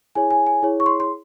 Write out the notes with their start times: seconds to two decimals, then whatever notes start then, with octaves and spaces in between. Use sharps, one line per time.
0.15 E4 G#4 C#5 G#5
0.31 G#5
0.47 G#5
0.62 E4 G#4 C#5
0.80 C#6
0.86 C6
1.00 C6